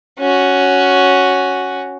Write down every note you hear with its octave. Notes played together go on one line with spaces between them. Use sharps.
C#4 F#4